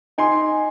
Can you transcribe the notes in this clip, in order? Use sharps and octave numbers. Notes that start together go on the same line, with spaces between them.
D#4 G#5 C6